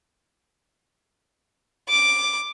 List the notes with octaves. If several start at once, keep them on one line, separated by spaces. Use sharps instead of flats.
D6